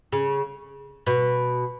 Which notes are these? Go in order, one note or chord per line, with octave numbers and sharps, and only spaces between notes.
C#3
B2